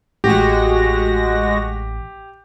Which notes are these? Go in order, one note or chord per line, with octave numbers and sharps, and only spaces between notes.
A1 G#3 F#4 G4 A#6